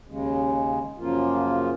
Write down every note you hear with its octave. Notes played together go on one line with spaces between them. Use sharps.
D#2 C#3 G#3
F#2 C#3 F3 A#3 F4